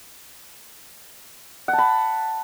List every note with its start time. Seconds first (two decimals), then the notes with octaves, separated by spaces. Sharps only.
1.68 F#5
1.73 A5
1.78 B5